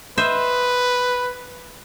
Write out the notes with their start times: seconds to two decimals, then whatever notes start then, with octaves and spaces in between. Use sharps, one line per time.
0.18 B4 C5 D#5 E5